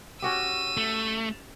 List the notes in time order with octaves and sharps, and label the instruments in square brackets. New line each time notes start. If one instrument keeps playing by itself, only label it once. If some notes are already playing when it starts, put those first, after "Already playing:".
[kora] C#4 F#4 G4 [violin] E6 D#7
[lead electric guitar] A3